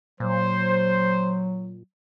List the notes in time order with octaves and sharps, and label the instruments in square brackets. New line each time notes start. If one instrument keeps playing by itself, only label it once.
[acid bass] A#2 [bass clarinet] F#3 [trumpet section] C5